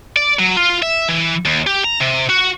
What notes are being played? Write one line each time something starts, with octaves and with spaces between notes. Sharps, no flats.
D5
F#3
F4
E5
E3
D#2
G4
A#5
C3
F#4